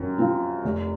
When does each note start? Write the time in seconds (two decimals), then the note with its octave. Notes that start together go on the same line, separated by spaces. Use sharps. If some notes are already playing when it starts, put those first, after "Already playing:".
Already playing: F#2 C4
0.18 F3 C4
0.64 F1